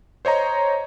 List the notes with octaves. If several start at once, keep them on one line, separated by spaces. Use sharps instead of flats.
C5 C#5 D#5 A#5